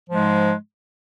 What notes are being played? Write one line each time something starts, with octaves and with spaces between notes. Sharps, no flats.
G#2 F3 G#3